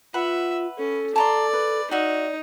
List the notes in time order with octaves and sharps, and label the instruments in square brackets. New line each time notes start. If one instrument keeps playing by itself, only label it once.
[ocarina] F4 [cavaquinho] B4 F#5 B5 [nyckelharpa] E5
[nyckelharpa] C#4 [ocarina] A4
[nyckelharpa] D5 [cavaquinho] A5 A#5 C6
[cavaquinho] B4
[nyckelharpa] D#4 [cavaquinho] F#4 E5 [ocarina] D5